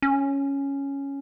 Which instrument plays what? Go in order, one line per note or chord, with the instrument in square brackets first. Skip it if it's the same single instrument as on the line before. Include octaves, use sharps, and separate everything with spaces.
[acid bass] C#4